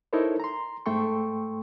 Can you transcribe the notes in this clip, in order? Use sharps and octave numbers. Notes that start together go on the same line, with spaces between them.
D#4 E4 A4 A#4 C5 C#5
A#5 C6
G#2 A3 A4 G5 C6 C#6